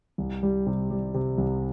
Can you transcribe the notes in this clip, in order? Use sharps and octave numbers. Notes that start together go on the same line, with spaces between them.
C2
G3
C3
G3
C3
C2